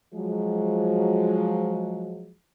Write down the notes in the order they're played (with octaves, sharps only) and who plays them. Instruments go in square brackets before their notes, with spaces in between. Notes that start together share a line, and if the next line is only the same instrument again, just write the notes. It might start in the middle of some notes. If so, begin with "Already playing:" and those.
[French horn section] F3 F#3 G#3